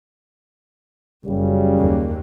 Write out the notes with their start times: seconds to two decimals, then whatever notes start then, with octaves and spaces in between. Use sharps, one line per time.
1.25 F#1 F#2 C#3 G3
1.78 D#2 A#3